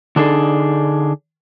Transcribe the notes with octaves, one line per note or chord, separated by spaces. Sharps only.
D3 D4 D#4 G#4 A4